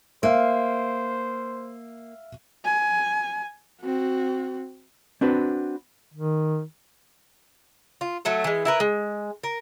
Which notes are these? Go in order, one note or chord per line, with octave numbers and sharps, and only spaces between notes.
A#3 C5 E5 F5
G#5
C4 F#4
C4 D4 F#4 B4
D#3
F4
F#3 A3 A4
E3 G#3
E4 A#4 B4
G#3
A#4